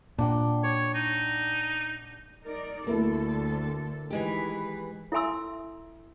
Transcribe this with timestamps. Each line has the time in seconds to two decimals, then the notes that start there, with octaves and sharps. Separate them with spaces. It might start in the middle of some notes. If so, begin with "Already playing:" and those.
0.19 A#2 D4 F#5 G5
0.64 C#5 D5
0.94 D#4
2.45 D#4 A#4 D5
2.87 D2 D3 A3 A#3 E4 A4 A#4
4.11 D#3 E3 G#3 G4 B4
5.12 E4 A4 E5 G#5 C6 E6